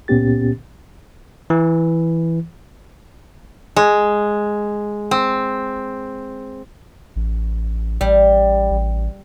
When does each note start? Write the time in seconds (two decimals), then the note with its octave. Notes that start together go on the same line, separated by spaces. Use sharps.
0.08 C#2 A#2 B3 C#4 G4 A6
1.50 E3
3.76 G#3
5.11 C4
7.16 A1
8.01 A1 G3
8.71 A1